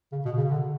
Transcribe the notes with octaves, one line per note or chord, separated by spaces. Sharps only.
C#3
B2
C#3
D3